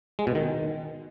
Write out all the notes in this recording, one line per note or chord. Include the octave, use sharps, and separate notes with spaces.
G#3
B2
D#3